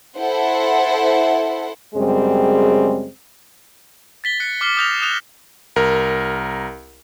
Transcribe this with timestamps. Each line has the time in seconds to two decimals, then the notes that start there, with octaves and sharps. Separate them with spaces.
0.17 E4 A4 C5 F#5
1.95 F#2 C#3 G3 G#3 C4 G#4
4.24 A6 B6 G7
4.40 F#6 C#7
4.61 D6 F6 C7 G7
4.77 D#6 F6 G6 A#6 F7
5.02 D#6 F#6 G6 E7 F7
5.76 C2 A#4